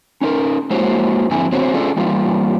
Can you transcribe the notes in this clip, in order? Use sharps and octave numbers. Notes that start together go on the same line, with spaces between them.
C#4 D#4 A#4
G#3 A#3 E4 F#4 C5 C#5
F2 G#2 D3 C4 E4 G#5
D3 B3 C4 F#4 C5 C#5
C#4 D4 F4 G#4 A4 D5
E3 G3 A#3 F4